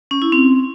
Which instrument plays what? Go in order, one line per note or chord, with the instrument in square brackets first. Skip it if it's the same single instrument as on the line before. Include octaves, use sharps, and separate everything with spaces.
[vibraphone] C#4
E4
C4